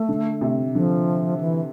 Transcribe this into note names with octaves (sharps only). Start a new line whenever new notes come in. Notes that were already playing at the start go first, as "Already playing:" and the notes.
Already playing: A3
D3
C3
D3 F3
E3